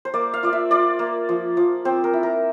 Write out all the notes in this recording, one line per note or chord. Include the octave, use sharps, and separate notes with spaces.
C5
A#3 D5
F5
F4 D5
E5
F4 D5
A#3
F3
F3
C4 C5
A#4
E4
A#4